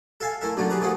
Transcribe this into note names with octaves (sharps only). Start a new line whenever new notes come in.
A4 E5 F5 G#5 A5
A3 E4 A#4 E5
F#2 A#2 D3 F#3 A3
G4 G#4 B4 A#5
D#3 F3 A3 F#4 G#4